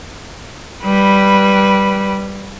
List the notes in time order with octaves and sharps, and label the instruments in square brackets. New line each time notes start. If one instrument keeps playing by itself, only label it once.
[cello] G3 B4